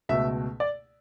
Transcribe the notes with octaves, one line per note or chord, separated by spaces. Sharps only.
C#2 B2 A3 E5
D5